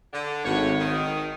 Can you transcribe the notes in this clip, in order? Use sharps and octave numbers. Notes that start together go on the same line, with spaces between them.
D3
G#1 A2 F#4 C#5
D#3